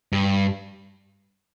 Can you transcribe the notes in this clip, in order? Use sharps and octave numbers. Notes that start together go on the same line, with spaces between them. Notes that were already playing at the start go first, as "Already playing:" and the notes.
G2